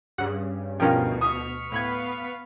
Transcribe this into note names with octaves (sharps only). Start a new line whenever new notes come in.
G2 C#3 F#5
D2 B2 F3 C#4 F4 A#4 G5
C#6 D#6 F6 B6
A2 B3 B4 F5 B5 G#6